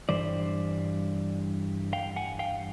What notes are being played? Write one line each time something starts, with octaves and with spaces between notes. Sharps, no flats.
G2 E3 G3 C5 D5
F5 G5
F#5 G#5
F5 G5